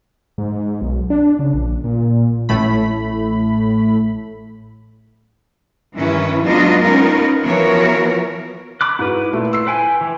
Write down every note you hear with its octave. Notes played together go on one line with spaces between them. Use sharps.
G#2
B1
D4
C#3
A#1
A#2
A1 A2 A3 B5
G2 D#3 E3 C#4 E4 B4
F#3 G#3 B3 D4 F4 D#5
B3 C#4 D#4 F4 A#4
E3 F3 B3 F#4 A#4 C#5
B5 D6 F#6
G#2 E4 F#4 B4
A#2 A3 F4
C6 E6 C7
B4 G5 G#5
E3